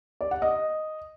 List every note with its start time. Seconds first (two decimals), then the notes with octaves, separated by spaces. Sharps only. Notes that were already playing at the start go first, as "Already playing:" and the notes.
0.21 D5
0.31 F#5
0.42 D#5